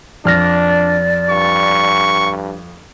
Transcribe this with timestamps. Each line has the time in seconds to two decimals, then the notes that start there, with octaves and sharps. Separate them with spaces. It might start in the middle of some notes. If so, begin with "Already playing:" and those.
0.25 F2 D4 D5 F6 A#6
1.30 G2 C#6